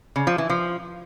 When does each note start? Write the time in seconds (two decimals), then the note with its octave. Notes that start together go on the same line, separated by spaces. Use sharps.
0.16 C#3
0.27 F3
0.38 E3
0.50 F3